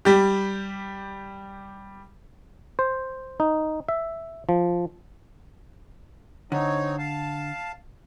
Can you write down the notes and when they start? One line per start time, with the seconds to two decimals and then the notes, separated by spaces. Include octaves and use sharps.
0.05 G3 G4
2.79 C5
3.40 D#4
3.89 E5
4.49 F3
6.52 D3 C4 D#4 C#5
6.98 F5 A5